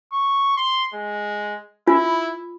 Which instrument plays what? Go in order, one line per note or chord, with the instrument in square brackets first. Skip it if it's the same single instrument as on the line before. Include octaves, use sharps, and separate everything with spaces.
[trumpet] C#6
C6
G#3
[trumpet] E4 [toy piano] F4